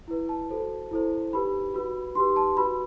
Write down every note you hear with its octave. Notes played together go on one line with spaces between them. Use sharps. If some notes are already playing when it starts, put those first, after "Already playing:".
E4 B4
A5
F#4 A4 C5
E4 A4 C5
D#4 G4 B4 B5
F#4 B4
D#4 G4 B4 C6
A5
F#4 B4 B5